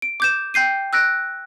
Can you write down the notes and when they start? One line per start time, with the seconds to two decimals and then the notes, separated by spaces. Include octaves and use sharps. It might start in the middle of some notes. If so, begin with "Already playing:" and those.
0.02 D7
0.20 D6 G6 E7
0.54 G5 G6 C7 D#7
0.93 E6 F#6 A#6 D7